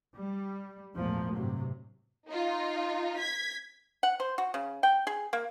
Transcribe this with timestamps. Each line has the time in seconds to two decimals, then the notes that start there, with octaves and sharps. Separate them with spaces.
0.16 G3
0.95 A#1 E2 G#2 F3 A3 A#3
1.35 A1 G2 C3 F#3
2.28 D#4 F4
3.20 G#6 B6
4.03 F#5
4.20 C5
4.38 F#4
4.54 C#3
4.83 G5
5.07 G#4
5.33 A#3